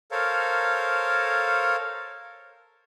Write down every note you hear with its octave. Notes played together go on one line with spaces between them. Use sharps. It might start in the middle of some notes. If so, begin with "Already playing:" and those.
A4 A#4 C5 C#5 F5